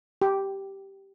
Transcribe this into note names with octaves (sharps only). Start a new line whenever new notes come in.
G4